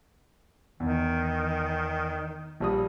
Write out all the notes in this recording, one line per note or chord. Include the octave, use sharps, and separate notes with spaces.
E2 D#3
A#1 G3 D#6